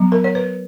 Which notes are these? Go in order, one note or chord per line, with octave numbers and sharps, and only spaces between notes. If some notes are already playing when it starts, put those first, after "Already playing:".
Already playing: F#3 B3
A#4
C#5
B4